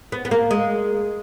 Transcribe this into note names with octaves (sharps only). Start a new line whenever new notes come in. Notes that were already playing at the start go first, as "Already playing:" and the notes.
B3
B3
A#3
G#3